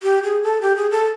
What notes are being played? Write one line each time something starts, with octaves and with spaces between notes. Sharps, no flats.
G4
G#4
A4
G4
G#4
A4